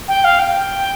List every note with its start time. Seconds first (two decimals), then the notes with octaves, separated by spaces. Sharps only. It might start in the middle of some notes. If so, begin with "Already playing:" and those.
0.08 G5
0.24 F5
0.39 G5